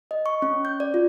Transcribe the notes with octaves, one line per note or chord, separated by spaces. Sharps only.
D#5
C#6
C#4
G6
D5
F4